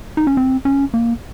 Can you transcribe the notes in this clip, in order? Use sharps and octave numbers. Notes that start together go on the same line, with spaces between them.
D#4
C#4
C4
C#4
A#3